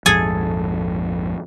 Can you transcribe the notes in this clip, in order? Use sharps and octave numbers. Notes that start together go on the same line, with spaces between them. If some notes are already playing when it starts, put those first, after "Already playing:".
A#1 F2 G#2 G#4 A4 G#5